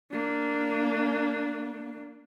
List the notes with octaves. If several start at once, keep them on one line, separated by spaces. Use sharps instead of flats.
A#3 D4